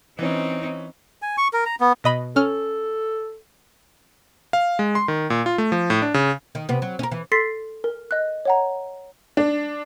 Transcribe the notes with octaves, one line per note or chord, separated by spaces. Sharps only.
E3 C4 C#4 D#4
G#5
C#6
A#4
A#5
B3
B2 D#5 B5
C#4 A4 F6
F5
G#3
C6
D#3
A#2
F4
A3
F3
A2
D4
C#3
D#3
C3 B3
F#3
C#4 A#4
E3
A4 C6 A6 B6 C7
A#4
D#5 F#6
C#5 F#5 A#5
D4